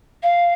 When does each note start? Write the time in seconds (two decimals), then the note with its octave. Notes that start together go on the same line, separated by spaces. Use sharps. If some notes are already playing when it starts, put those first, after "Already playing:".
0.22 F5